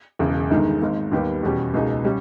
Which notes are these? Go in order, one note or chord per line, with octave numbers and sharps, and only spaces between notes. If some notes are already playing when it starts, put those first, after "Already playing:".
E1 E2 C#3
G1 G2 D#3 G#3 D#4
G#1 G#2 D#3 A#3
D#2 D#3 G3 B3 G4
E2 B2 G3 C#4 G4
C#2 B2 A#3 D#4 G#4
G3 C#4